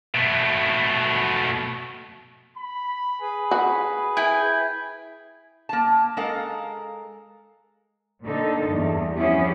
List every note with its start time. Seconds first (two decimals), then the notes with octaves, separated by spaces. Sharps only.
0.14 B2 A3
2.57 B5
3.20 G#4 B4
3.51 F#4
4.17 E4 G5 G#5
5.69 A#3 A5
6.17 G#3 A4 A#4 F5
8.23 A#2 D3 D#4 A4
8.68 E2 G2
9.16 F3 B3 C#4 E4 G4 G#4